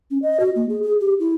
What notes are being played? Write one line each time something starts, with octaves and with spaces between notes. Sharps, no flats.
C#4
D#5
F#4
A#3
G#4
G#4
G4
E4